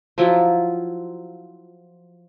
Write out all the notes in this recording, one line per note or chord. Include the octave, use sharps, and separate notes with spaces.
F3 F#3 E4 F4